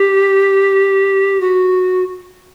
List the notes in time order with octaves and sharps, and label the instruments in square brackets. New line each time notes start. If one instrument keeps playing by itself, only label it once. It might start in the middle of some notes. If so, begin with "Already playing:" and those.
Already playing: [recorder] G4
F#4